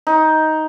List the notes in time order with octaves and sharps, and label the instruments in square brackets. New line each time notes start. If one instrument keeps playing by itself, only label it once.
[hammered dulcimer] D#4